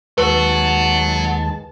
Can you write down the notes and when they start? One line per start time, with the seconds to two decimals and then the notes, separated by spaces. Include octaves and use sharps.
0.18 D#2 F#3 G#3 F#4 B4 A5